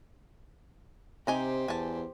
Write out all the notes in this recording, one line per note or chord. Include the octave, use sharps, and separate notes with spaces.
C3 D#4 G4 C5 G#5 A#5
E2 G#5 A5